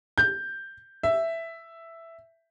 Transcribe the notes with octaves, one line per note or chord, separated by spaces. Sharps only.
G6
E5